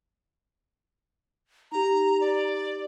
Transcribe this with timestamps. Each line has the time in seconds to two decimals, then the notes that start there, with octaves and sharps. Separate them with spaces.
1.72 D#4 G4 A#5
2.21 D5